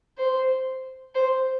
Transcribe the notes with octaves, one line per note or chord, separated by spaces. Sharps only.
C5
C5